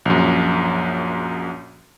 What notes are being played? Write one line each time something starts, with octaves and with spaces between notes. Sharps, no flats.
A#1 F#2